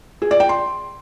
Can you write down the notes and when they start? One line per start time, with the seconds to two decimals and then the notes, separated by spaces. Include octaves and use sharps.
0.22 G#4
0.31 D5
0.40 G5
0.49 C6